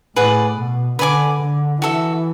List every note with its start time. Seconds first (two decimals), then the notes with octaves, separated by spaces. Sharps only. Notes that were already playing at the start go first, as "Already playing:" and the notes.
0.16 A2 G#4 B4 D5 F#5
0.58 B2
0.99 D3 B4 D5 G#5 D6
1.41 D3
1.82 E3 F#4 A4 E5